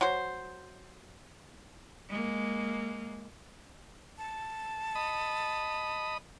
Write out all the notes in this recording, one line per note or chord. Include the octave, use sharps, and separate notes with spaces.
F#3 C5
G#3 A#3
A5
D#5 B5 D#6